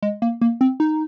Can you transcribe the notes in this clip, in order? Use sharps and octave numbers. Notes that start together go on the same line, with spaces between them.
G#3
A#3
A#3
C4
D#4